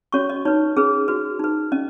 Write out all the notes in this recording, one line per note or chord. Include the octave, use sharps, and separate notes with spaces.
C#4 F#4 C#5 C#6
D#5
D#4 B4 C#5
C#4 G#4 B4
F#4 B4
D#4 B4
C#4 D#5